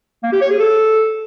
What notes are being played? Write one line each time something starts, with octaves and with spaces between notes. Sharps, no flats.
A#3
G4
C#5
G#4
A4